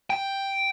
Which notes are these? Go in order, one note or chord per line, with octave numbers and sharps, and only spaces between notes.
G5